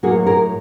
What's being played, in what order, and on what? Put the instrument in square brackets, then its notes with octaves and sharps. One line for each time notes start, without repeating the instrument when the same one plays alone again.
[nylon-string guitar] A2 F#3 A#3 F#4 G#4
G#4 A#4